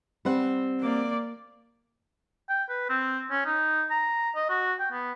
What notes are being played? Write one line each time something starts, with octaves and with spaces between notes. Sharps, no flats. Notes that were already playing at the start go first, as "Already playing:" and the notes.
G3 C4 F#5
A#3 D5
G5
B4
C4
C#4
D#4
A#5
D#5
F#4
G5
B3